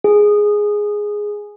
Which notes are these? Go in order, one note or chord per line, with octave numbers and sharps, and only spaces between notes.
G#4